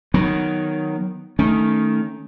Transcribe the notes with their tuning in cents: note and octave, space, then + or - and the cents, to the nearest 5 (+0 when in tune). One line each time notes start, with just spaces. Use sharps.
D#3 -5 F#3 +0 B3 +0
D#3 +0 A3 +0 C#4 +15